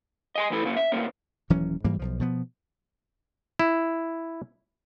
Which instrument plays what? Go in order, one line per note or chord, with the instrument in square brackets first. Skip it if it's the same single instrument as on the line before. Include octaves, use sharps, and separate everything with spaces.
[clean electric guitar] D#5 G#5 C6
E3 A3 E4 A4
C#3 A#3 C#4
E5
D2 A2 A#3 C#4
[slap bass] D#1 E3 F#3 C#4
G#2 E3 G3 A#3
B1 F3
B2 F3 B3
[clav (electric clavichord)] E4